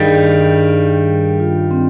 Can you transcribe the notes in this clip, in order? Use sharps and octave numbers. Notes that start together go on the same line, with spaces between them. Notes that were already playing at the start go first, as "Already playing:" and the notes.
Already playing: G2 D#3 G3 G#4
F4
C4